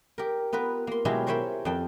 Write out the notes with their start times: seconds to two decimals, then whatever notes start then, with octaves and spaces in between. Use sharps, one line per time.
0.18 G4 A#4
0.53 B3 F4 A#4 B4
0.87 A#3 C6
1.05 B2 F#3 G#3 E4 F4 G4
1.27 A#4 C5 C#5 E5 G5 B5
1.65 F2 G5 A5